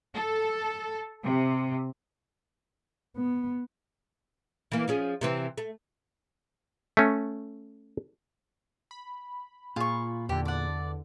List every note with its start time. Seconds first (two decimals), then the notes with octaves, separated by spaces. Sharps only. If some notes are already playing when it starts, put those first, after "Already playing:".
0.15 A4
1.24 C3
3.17 B3
4.72 E3 A#3
4.88 F3 C#4 G#4
5.21 C3 E3 C4
5.58 A3
6.97 A3 C#4
8.91 B5
9.76 A#2 F4 G#4 C#6
10.29 E2 D3 G4
10.45 D5 F#5